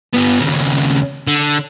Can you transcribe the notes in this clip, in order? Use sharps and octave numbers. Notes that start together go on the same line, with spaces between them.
G2 B3
D#2 C#3
D3